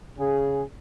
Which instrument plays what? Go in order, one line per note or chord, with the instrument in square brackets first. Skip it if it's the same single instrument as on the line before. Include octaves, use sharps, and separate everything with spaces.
[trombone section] C#3 G#4